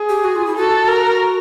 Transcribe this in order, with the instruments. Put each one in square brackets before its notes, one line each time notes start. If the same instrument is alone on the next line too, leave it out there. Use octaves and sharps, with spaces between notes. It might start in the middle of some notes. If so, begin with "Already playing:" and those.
Already playing: [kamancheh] G#4
[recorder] G4
F#4
F4
E4
[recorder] F#4 [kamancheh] A4
[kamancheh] A#4